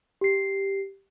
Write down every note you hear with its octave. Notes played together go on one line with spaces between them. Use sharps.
G4 C7